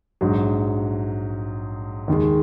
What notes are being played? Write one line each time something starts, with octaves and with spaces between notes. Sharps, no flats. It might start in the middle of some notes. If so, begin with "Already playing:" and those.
A#1 G#2 F#3
D#2 D#3 G#3